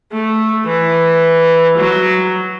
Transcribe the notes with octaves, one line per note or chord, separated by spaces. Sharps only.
A3
E3
F#3